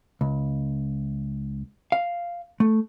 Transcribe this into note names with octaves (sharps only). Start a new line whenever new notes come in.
C#2
F5
A3